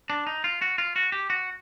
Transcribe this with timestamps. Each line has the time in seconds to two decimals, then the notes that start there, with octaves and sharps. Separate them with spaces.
0.10 D4
0.27 D#4
0.44 F4
0.62 F#4
0.78 F4
0.96 F#4
1.12 G4
1.30 F#4